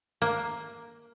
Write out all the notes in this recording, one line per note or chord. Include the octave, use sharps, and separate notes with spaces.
A#3